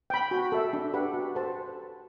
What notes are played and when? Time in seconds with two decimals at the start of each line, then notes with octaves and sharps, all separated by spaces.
0.10 G5 B5
0.31 F#4
0.52 A4 E5
0.73 D4
0.94 G4 B4 F#5 B5
1.14 F#4
1.35 A4 C5 F#5 A5